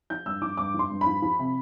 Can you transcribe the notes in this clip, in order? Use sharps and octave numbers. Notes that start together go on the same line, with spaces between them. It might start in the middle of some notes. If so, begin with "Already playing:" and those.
F3 G6
G2 E6
F3 D6
G2 D6
F3
C6
G2
B5
F3
F3
C3